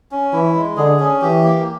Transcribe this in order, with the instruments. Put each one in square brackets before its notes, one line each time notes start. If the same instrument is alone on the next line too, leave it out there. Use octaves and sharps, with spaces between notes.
[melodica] C#4
[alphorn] E3 [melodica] E4
[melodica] G#3
[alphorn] D3 [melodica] G#4
[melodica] C#4
[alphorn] E3 [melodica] G4
[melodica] A#3